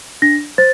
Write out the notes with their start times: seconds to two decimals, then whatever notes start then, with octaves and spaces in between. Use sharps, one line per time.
0.22 D4 A#6
0.58 C5 A6